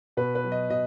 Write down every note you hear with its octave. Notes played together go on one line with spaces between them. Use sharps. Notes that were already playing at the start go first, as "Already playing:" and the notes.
B2 B4
B4
F#3
D#5
B2 D#5